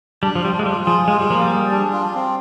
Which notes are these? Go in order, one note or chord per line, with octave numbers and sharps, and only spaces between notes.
G3 D4
F3
G3 F4
G#3
G3 F4
F3 G#4
G#3 F4
G3
F3 A#3
G3
G#4
D4
F4
C4